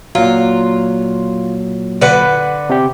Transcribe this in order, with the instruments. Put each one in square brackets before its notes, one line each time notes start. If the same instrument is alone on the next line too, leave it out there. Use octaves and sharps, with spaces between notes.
[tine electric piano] A#2 F#3 [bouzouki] F4
[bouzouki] D3 B4 F#5
[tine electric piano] C3 G4